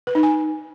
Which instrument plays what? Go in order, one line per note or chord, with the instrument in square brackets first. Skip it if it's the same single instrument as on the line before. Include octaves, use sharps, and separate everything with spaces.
[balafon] B4
D#4
G#5